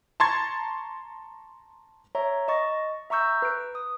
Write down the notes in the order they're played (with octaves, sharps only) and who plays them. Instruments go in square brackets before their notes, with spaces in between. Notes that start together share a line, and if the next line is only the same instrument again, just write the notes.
[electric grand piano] A5 A#5 C6 C#6 G#6 A6
[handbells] C#5 E5 A#5
D#5 C#6 A6
E5 A#5 C#6 E6 G6
B4 D7
D#6